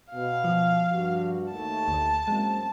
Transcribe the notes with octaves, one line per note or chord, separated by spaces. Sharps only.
B2 F5
F3
G2 F#4
D#2 A3 A5
D2
F#2 G#3 A#3 C4